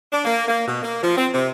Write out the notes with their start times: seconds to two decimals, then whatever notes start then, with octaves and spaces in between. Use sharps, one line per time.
0.12 D4
0.25 A#3
0.48 A#3
0.67 B2
0.83 A#3
1.03 F3
1.16 C4
1.33 C3